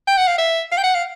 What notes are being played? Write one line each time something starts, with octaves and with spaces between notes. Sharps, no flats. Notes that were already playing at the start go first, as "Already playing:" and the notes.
G5
F#5
F5
E5
F5
G5
F#5
F5